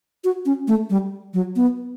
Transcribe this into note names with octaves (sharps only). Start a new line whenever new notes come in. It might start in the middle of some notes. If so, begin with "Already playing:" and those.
F#4
C#4
A3
G3
F#3
B3